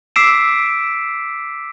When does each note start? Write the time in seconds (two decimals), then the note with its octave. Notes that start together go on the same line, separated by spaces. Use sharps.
0.16 D6 E6 B6 C7 D7 E7